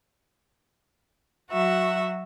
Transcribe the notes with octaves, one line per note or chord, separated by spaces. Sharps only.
F#3 F#4 E5